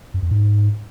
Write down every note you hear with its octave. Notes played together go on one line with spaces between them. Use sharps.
F#2
F2
G#2